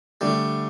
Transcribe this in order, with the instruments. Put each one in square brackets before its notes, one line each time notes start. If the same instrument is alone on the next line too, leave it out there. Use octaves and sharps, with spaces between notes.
[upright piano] D3 A3 D4 [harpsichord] G3